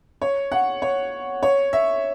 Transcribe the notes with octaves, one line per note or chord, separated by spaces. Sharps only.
C#5
F#5
C#5
C#5
E5